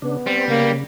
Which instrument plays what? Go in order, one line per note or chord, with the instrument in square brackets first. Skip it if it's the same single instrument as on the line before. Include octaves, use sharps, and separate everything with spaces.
[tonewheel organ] C#3 D4 [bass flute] B3
[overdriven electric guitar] G3 [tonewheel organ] C4
[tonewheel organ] C#3 [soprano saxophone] A#3